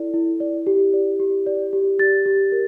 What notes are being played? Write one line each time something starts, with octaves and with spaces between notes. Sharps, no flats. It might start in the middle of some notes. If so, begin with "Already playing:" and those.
Already playing: E4 A4 D5
E4
D5
G4
D5
G4
D5
G4
G4 A6
G4
A#4